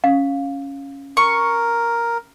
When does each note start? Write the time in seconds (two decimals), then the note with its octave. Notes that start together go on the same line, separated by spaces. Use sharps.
0.04 C#4 F5
1.17 A#4 C#6